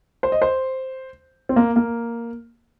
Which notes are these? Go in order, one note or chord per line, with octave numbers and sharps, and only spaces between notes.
C5
D#5
C5
C4
A#3
A#3